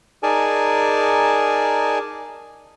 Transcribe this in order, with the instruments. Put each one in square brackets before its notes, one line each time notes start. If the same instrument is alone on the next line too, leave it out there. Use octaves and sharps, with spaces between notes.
[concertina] D#4 G#4 A#4 D5 G#5 A5